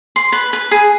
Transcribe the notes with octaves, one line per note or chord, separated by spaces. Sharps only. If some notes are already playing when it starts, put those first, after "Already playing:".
C6
B4
B4
G#4